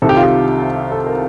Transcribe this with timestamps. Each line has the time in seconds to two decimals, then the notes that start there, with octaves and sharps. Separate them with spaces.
0.02 C2 C3 D#3 A4
0.09 G4
0.16 F4
0.23 G4
0.92 A4
1.06 A#4